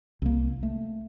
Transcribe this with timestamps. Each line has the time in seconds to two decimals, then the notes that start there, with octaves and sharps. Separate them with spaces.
0.22 C2 A#3
0.63 A3